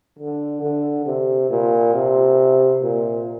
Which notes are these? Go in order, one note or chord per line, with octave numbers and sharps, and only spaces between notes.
D3
D3
C3
A#2
C3
A#2